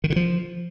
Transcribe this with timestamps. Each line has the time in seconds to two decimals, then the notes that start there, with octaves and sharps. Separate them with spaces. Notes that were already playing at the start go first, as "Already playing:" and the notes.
0.04 D#3
0.10 D3
0.16 F3